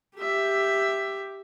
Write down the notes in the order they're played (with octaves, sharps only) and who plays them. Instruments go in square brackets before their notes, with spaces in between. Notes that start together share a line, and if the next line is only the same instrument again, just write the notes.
[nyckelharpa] G4 E5